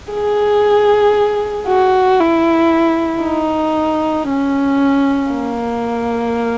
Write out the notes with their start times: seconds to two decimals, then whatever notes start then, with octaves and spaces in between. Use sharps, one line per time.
0.13 G#4
1.68 F#4
2.20 E4
3.24 D#4
4.29 C#4
5.32 A#3